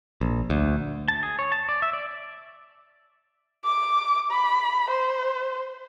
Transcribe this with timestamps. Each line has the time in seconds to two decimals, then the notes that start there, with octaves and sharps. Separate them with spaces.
0.21 A#1
0.50 D2
1.08 A5
1.23 G#4
1.39 C#5
1.52 A5
1.69 D5
1.82 E5
1.93 D5
3.65 D6
4.31 B5
4.90 C5